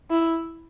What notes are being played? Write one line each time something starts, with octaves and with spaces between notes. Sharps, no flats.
E4